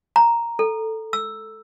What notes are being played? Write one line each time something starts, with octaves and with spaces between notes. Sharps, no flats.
A#5
A4
E6